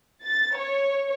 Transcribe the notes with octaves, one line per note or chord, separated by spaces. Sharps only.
A6
C#5